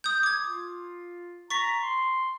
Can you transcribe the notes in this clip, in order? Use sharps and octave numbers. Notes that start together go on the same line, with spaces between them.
D#6 G6
D6 G#6
F4
A#5 C#6 A6 B6
C6